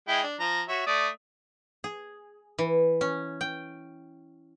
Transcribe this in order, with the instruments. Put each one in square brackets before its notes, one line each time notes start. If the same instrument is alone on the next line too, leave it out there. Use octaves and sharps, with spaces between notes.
[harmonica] G#3 E4 G5
D4
F3 A#5
F#4 C#5 E5
A3 D5 D#6
[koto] G#4
E3
C#4
G5